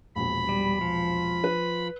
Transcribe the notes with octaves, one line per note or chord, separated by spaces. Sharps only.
E1 A#1 B5
G3
F3
B4